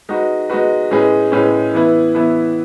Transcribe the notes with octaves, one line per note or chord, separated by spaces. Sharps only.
G#3 D#4 F#4 B4
G#3 D#4 F#4 B4
A2 G#3 C#4 G#4 B4
A2 G#3 C#4 G#4 B4
E3 B3 E4 B4
E3 B3 E4 B4